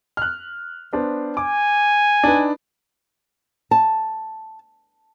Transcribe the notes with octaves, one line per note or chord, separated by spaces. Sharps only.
F6 F#6
B3 D4 C5
G#5 D6
D4 D#4 B4
A5